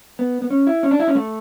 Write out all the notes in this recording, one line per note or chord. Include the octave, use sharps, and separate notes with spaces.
B3
B3
C#4
E4
C#4
D4
E4
C#4
A3